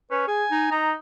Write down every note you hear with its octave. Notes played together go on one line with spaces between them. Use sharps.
C#4 B4
G#4 G#5
D#4
D#4 A#5